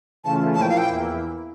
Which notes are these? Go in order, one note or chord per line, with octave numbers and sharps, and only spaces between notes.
C#3 E3 A3 C#4 F4 A5
A#2 F3 A#3 E4 A5
G5
F5
G5
E2 E3 A#3 E4